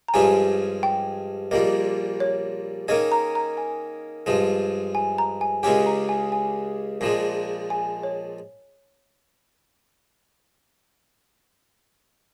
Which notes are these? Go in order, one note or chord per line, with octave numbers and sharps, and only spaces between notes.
A#5
G2 F3 G#3 C#4 G4 G#5
G5
A#1 A#2 G3 A#3 D#5
C#5
D#3 A#3 C#4 G#4 D#5
A#5
A#5
G#5
G2 F3 G#3
G#5
A#5
G#5
C#2 C#3 G#3 C#4 G4 G#5
A#5
G#5
G#5
A#1 A#2 F3 G#3
G#5
C#5